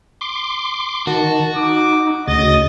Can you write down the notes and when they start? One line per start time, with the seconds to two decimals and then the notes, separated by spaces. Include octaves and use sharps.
0.21 C6 D6
1.07 D#3 F#4 A5
1.56 D#4 D6
2.28 D2 C#3 D#5 A6